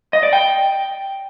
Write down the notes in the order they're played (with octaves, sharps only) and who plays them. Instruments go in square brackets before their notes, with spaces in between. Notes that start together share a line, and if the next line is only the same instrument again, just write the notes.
[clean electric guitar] D#5
D5
G5